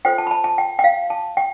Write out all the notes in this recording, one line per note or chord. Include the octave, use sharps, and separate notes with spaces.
F4 A4 C5 G5
A5
B5
A5
A5
G5
G5
F5
A5
G5